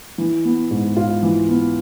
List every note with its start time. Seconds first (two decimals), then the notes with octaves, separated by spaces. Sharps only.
0.18 E3
0.45 B3
0.71 G#2
0.96 G#2 F4
1.23 E3
1.49 B3